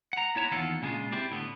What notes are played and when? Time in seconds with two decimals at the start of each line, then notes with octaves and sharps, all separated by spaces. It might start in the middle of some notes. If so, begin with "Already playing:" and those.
0.13 F#5 A#5
0.35 B3 E4 C#5 A5 A#5
0.52 E2 D#3 A#3 F4 A4 F#5
0.82 A#2 C#3 G3 G#3 D4 F4
1.12 C4 E4 G4 C5 D5
1.31 A2 D3 B3